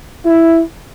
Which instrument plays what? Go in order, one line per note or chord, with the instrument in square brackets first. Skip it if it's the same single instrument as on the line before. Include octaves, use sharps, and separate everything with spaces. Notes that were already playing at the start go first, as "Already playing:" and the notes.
[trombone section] E4